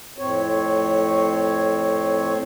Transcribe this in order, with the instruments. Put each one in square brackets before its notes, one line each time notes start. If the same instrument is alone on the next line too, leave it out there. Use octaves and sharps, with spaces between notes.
[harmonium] F2 A2 C4 C#5